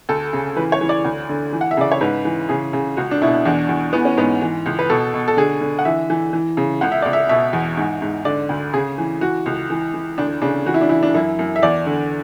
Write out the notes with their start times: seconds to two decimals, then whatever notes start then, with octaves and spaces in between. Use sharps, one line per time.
0.09 D2 A4
0.33 C#3
0.56 E3 B4
0.72 C#5
0.81 E3
0.89 D5
1.05 D2
1.29 D3
1.53 E3
1.61 F#5
1.71 E5
1.77 C#3 D5
1.92 C#5
2.01 G#2 B4
2.25 E3
2.49 C#3 G#4
2.73 C#3
2.97 C#2 F#4
3.11 D4
3.22 B2 E4
3.45 E2 D4
3.69 E2
3.93 E3 B3
4.05 C#4
4.17 G#2 B3
4.42 E3
4.66 C#2
4.79 B4
4.90 B2 A4
5.14 B2
5.28 A4
5.37 D3 G#4
5.61 D3
5.79 F#5
5.85 E3 E5
6.10 E3
6.33 E3
6.57 C#3
6.81 C#2 F#5
6.92 E5
7.02 C#2 D5
7.13 E5
7.29 B2 E5
7.53 E2
7.77 G#2
8.02 G#2
8.25 D3 D5
8.49 D2
8.74 C#3 G#4
8.98 E3
9.21 E3 F#4
9.46 C#2
9.70 E3
9.94 E3
10.18 D2 D4
10.42 C#3 D4
10.66 E3 F#4
10.74 E4
10.81 D4
10.89 E3 E4
11.03 D4
11.14 F#2 E4
11.39 F#2
11.56 E5
11.62 E2 D5
11.86 D3